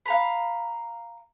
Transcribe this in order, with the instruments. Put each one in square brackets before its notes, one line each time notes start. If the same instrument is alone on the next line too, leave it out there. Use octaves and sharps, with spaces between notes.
[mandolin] F5 A#5 B5